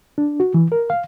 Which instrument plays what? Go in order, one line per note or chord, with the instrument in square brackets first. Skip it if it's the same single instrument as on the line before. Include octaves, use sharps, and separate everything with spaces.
[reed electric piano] D4
F#4
E3
A#4
F5